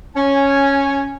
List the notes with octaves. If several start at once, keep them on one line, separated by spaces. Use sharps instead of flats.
C#4 G#5